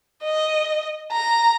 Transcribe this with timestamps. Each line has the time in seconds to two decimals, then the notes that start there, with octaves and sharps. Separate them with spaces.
0.24 D#5
1.12 A#5